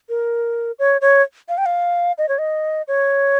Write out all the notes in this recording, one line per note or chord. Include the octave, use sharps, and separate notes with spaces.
A#4
C#5
C#5
F5
G5
F5
D#5
C#5
D#5
C#5